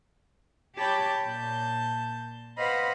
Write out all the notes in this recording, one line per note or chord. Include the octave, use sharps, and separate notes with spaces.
G4 C#5 A5 B5 D6 G6
A#2 A5 G6
B4 C5 D#5 F5 F#5 B5